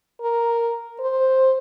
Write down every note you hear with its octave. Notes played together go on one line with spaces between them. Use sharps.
A#4
C5